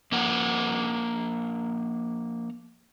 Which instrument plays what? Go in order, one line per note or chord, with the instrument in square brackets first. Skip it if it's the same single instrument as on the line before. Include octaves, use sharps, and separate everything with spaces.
[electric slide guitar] F3 A#3 A#4 F#5